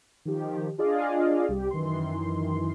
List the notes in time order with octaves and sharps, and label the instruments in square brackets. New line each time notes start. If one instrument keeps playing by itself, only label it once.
[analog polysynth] D#3 F3 G4
D4 F4 G#4 D5 D#5 F5
C2 G3 G4
F#2 D#3 E3 C6